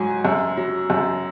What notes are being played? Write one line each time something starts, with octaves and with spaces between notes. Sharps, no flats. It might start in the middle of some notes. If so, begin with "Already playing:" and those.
Already playing: G#2 F#3 G#5
F#2
F#3
F#2